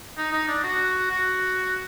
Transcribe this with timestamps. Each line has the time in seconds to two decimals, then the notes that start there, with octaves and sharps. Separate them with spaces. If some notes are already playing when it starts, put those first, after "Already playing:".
0.17 D#4
0.33 D#4
0.48 D4
0.64 F#4
1.10 F#4